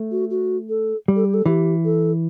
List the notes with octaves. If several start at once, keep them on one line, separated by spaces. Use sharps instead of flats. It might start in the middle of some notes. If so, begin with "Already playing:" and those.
Already playing: A3
F#4
F#4
A4
G3
A4
G4
A4
E3 G4
A4